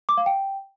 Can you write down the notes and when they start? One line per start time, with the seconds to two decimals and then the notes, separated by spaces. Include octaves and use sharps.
0.09 D6
0.17 F5
0.26 G5